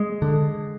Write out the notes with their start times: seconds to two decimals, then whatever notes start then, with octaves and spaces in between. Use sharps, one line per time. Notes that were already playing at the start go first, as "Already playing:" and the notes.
Already playing: G#3
0.22 D3